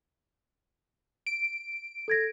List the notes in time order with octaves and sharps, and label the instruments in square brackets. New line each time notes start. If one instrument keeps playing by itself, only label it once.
[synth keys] D7
[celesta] A4 G#6 A#6